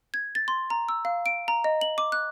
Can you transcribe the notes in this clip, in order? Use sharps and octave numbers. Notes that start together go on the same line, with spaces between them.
G#6
A6
C6
A#5
E6
F5
D7
A#5
D#5
F#7
D6
F#6